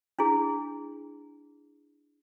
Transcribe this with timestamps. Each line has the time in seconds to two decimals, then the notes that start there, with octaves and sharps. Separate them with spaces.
0.19 D4 E4 G#4